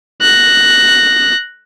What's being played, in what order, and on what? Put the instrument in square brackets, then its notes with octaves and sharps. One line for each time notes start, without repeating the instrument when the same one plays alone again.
[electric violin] F#6 A#6